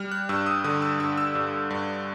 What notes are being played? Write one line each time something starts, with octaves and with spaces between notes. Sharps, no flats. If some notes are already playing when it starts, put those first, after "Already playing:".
Already playing: G3 F6
F#6
G2 E6
D#6
D3 D#6
E6
G2 E6
E6
G2
G2